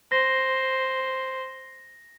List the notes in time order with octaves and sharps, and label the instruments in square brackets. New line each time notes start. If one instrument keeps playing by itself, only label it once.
[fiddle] C5 [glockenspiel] A#6